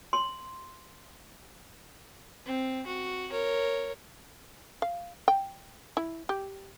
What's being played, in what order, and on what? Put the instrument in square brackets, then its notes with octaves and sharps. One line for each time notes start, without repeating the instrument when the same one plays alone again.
[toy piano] C6
[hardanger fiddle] C4
F#4
A#4 C#5
[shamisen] F5
G5
E4
G4